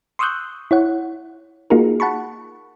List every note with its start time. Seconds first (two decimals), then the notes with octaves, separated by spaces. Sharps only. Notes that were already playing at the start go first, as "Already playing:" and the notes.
0.19 C6 C#6 D#6 E6 F#6 G6
0.71 E4 C#5 F#5
1.70 A#3 D#4 F4 F#4 G#4 A#4
2.00 F#5 A5 B5 C#6